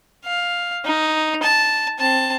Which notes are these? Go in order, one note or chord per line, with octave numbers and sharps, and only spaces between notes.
F5
D#4
A5
C4 A5